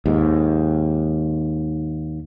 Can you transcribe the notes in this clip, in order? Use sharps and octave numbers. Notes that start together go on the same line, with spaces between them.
D#2 G#2